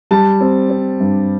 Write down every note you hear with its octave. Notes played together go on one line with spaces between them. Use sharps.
G3 A5
C4
C4
G2